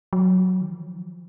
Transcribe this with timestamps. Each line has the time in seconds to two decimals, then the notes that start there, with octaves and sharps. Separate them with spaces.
0.13 F#3
0.61 D#3
0.71 F3